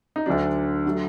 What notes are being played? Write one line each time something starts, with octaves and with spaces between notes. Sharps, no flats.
D#4
D2 D3 F#3 D4
D3 F#3 A3